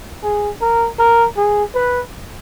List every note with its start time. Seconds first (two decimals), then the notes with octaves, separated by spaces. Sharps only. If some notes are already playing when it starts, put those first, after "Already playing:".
0.23 G#4
0.61 A#4
0.99 A#4
1.37 G#4
1.75 B4